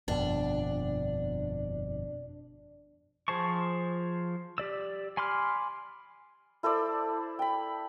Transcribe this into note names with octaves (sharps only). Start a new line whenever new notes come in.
G1 F2 B2 D4
F3 G#4 C5 A5 C#6
G4 D5 E6
G#5 B5 C6 D6 F6
E4 A4 C5 D5
G5 B5